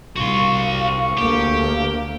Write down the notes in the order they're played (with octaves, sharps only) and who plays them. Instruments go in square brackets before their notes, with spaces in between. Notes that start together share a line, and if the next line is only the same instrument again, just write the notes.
[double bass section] C2 [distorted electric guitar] F#4 C6 [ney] F5 [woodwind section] C#6
[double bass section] D2 [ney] A#3 [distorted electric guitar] G4